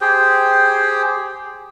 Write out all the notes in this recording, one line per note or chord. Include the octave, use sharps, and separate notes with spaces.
G4 G#4 C5 G5